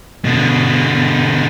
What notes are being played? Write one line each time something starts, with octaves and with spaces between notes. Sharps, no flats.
B2 D3